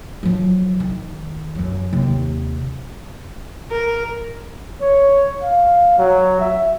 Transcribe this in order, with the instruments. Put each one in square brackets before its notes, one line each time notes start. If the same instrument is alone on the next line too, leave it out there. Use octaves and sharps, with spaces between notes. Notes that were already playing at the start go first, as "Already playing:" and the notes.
[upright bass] F3 F#3
D#3
F#2 F#3
D#2 C3
[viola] A#4
[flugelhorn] C#5
F5
F#3
E5